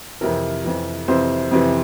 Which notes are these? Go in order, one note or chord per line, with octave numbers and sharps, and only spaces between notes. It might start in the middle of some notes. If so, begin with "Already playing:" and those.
F2 C3 E3 A#4
F2 C3 E3
F2 C3 E3 C5
F2 C3 E3